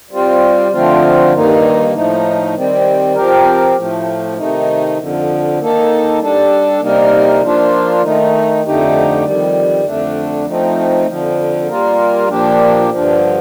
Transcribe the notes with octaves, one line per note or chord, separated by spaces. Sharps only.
G3 C4 F4
D3 F3 A3 C4 F4
G2 D#3 A#3 D#4
A2 F3 A3 D#4
D#3 G3 C4
F3 C4 G4 A#4
A2 F3 A3
C3 D#3 A3 D#4
F2 D3 F3
D#3 A#3 D#4 A4
G3 D4 A4
C3 G3 A#3 D#4 A#4
F3 A#3 D4 F4
D#3 A3 D#4
F2 D3 A3 D#4 G4
F2 D#3 G3
F2 D3 A3 D4
F3 A3 C4 D#4
F2 D3 F3
G3 A#3 F4 A#4
A#2 F3 A#3 D4 G4
G2 D3 F3